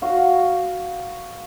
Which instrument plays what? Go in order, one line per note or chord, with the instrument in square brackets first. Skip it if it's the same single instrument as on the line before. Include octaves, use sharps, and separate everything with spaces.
[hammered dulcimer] F#4 F5